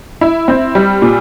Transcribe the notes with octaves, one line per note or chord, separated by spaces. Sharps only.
E4
C4
G3
A#2